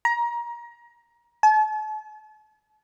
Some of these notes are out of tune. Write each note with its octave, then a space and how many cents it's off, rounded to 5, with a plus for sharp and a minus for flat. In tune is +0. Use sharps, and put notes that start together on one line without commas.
A#5 +25
A5 -40